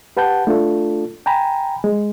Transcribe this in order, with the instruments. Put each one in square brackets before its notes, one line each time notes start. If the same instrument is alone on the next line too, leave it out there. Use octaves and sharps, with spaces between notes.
[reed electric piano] G4 B4 F#5 A5 G6
A3 D4 F4 A4
G5 G#5 A#5 B5
G#3